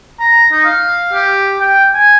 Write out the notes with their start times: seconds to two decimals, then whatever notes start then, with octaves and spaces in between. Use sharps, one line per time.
0.20 A#5
0.52 D#4
0.65 F5
1.13 G4
1.60 G5
1.94 G#5